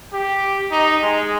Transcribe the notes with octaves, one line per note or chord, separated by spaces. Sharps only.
G4
D#4
G#3